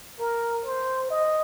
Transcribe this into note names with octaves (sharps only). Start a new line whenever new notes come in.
A#4
C5
D#5